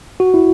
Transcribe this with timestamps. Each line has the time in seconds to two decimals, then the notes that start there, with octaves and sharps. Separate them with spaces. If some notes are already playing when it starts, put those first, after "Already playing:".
0.20 F#4
0.34 E4